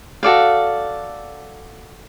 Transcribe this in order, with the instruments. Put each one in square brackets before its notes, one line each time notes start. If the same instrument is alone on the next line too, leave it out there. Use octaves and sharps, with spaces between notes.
[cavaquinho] F#4 A4 D5 F5